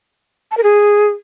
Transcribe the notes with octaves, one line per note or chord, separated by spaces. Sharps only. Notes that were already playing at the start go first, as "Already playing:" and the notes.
A5
A#4
G#4